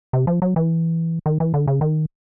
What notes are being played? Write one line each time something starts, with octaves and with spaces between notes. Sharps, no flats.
C3
F3
F#3
E3
D#3
E3
D3
C#3
D#3